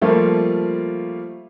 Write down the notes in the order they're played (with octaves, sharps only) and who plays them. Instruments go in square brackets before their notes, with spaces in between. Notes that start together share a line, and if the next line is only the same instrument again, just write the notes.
[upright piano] F3 G3 A3 A#3 F4